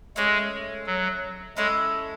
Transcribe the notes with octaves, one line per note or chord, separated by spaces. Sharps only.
G#3 A3 C#4 G#4 C#5
F#3
G#3 C#4 E4 A4 C#5